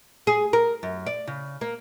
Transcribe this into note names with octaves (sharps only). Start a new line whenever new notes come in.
G#4
A#4
F#2
D5
C#3
A#3